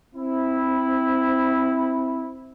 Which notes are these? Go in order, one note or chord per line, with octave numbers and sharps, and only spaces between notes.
C4 E4